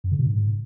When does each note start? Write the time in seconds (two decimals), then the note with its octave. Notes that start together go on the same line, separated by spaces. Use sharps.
0.04 F#2
0.11 C#3
0.19 B2
0.27 G#2